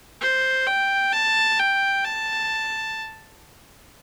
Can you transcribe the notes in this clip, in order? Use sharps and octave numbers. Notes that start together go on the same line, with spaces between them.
C5
G5
A5
G5
A5